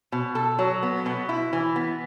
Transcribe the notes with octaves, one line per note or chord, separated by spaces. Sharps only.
B2
A4
F#3
B3
B2
E4
E3
B3